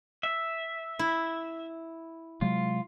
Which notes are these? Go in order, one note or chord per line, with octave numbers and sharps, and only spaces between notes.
E5
E4
C3 F#3 G#3 F4